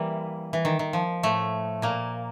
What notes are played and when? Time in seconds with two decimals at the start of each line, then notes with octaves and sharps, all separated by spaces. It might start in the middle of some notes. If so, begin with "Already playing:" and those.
Already playing: E3 G3 A#3
0.53 E3
0.65 D#3
0.79 D#3
0.93 F3
1.23 A2 A3
1.82 A#2 A#3